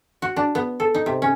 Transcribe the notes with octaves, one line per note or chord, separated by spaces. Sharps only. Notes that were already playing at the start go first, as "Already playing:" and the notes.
F#4
D4
B3
A4
D#4
C3
C#4